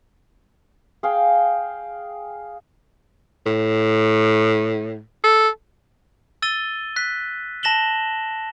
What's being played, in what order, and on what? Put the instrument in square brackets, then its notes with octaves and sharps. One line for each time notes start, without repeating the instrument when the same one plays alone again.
[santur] G#4 F5 G5
[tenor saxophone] A2
A4
[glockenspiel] E6 A6 D#7 G7
F#6 B6
A5 A#6 E7 F#7 G7